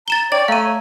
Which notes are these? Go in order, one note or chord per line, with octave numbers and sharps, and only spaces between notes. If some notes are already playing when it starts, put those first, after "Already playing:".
A#5 A6 E7 G7
C#5 D5 G5 A6
A3 F5 A#5 D#7